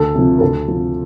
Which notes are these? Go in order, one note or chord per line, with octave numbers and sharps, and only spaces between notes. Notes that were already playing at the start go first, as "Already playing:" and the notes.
Already playing: D2 A4
C3 F3
A#4
D2 A4
C3 F3